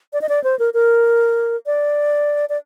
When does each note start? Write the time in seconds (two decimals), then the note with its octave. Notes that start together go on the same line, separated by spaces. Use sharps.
0.13 D5
0.21 D#5
0.29 D5
0.44 C5
0.59 A#4
0.74 A#4
1.66 D5
2.49 D5